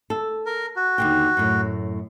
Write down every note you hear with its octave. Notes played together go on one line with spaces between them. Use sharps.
A4
A#4
F#4
D#2 D3 G5
F#2 A2